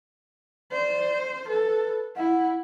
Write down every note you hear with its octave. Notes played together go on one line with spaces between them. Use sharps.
C5 D5
A4 B4
E4 F#5